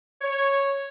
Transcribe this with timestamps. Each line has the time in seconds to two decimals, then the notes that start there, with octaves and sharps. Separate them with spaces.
0.21 C#5